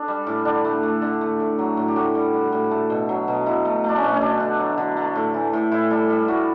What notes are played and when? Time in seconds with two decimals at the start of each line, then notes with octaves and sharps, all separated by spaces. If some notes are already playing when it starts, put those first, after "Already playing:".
Already playing: D4 A4
0.08 G3
0.27 A2
0.45 D3 D4
0.65 A3
0.83 A3
1.02 D3
1.21 A3
1.40 A2
1.59 F#3
1.77 A2
1.88 G4
1.96 A2 F#4
2.15 G3
2.34 G3
2.52 A2
2.71 A3
2.90 B2
3.09 F#3
3.28 B2
3.46 B2 E4
3.65 A3
3.84 A3
3.89 D4
3.96 C#4
4.03 B2
4.14 C#4
4.21 A3 D4
4.40 D3
4.59 F#3
4.78 D3
4.97 A3
5.16 A2
5.34 E3
5.53 A2
5.71 A2 E4
5.91 G3 A4
6.10 G3
6.28 A2 F#4